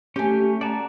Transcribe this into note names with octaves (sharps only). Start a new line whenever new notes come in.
A3 C#4 G4 G#5
F#4 D5 A5 A#5